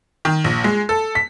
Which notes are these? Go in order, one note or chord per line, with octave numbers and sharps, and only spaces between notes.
D#3
A#1
G#3
A4
B6